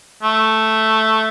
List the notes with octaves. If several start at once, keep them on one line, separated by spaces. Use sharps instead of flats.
A3